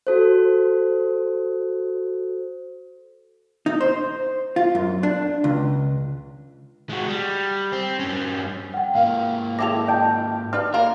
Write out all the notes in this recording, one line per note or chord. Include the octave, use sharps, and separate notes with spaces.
F#4 A4 C5
D#4
C5
F4
F#2
D4
C#2
G#3 F#4
G3
C4
G2 C#4
F#5 G5
G#2 A#3 F5
G#3 E4 A4 G5 D6 A#6 F7
D#5 G5 A5 G6
D4 D#4 B4 F6
A#3 D4 F4 A#4